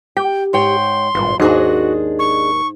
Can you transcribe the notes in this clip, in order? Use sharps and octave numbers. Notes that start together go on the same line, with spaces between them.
G4 G5
G#2 C#5 G5 C6
G#1 G2 A#2
D#2 G#2 D4 F#4 G#4 D#5
C#6